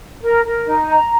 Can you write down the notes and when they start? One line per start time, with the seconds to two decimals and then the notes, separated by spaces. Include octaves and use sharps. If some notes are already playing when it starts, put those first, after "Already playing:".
0.21 A#4
0.44 A#4
0.66 D#4
0.90 A#5